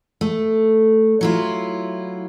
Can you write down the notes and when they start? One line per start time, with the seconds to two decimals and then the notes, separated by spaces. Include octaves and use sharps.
0.21 A3
1.21 F#3 E4 F4